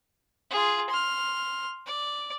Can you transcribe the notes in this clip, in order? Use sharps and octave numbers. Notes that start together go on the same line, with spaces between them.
F4 G#4
C6 F6
D5